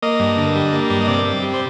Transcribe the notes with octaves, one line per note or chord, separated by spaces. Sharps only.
A#3 D#5
G2
D3
G3
A#3
G2
D#5
C3 D5
C3
G3
C5